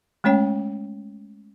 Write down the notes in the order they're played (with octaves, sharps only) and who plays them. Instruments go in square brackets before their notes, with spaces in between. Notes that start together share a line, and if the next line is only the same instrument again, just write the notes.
[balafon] G#3 A3 C#4 C#5 G5